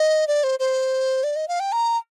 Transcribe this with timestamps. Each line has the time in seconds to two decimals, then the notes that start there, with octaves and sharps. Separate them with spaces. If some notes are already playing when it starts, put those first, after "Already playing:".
Already playing: D#5
0.27 D5
0.44 C5
0.59 C5
1.24 D5
1.36 D#5
1.48 F5
1.60 G5
1.72 A#5